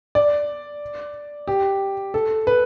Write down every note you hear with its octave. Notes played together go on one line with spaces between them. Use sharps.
D5
G4
A4
B4